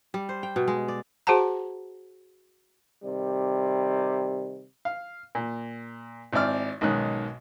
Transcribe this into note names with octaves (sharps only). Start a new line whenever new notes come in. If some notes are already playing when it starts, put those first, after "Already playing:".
G3
C5
G5
B2
G#3
D5
F#4 G#4 C5 F#5 A5 A#5
C3 D#3 G3
F5
A#2
G#1 C4 E4 D5 F6
B1 G#2 D#3 C#4 F#6